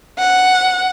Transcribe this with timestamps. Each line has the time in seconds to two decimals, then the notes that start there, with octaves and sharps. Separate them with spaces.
0.19 F#5